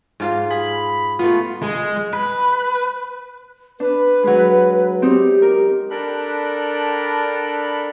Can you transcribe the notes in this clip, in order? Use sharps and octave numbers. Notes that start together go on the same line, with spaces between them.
G#2 F4 F5
G#4 B5
A3 B3 F4
G#3
B4
D4 B4
F#3 G#3
C4 D#4 G4
A#4
D4 A4 A#4 G5 B5 F#6